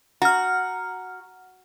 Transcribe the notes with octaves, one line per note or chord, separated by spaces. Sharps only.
F#4 A#5 F6